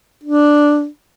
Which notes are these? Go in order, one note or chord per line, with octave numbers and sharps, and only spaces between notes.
D4